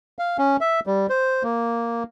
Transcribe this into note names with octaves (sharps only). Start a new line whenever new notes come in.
F5
C#4
E5
G3
C5
A#3